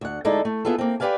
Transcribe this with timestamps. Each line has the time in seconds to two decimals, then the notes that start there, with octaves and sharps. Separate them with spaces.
0.01 D2 F#5
0.25 D2 G#3 D#4 E4 A4 D5
0.45 A3
0.65 B3 E4 F4 G#4 A4
0.78 A#3 C4
1.00 G4 G#4 B4 D5 F5 G#5